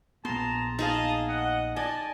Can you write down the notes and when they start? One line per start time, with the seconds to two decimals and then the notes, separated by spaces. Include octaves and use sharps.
0.25 A#1 B3 G#4 A5 A#5 C6
0.79 D#4 G#4 D#5 F5 A5
1.28 D#5 F#5
1.76 D5 D#5 G#5 A5